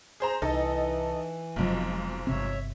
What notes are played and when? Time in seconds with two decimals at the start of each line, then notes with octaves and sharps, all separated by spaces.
0.20 G#4 C5 A#5
0.42 C2 E3 D#4 A4 D#5
1.56 F1 B1 G#2 C3 F3 F#3
2.27 G1 C3 C4 C#5 E5